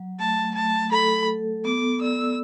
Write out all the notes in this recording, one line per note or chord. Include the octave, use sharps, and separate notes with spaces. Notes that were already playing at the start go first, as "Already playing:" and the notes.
Already playing: F#3
A3 A5
A3 A5
A4 B5
A4
B3 D6
D5 E6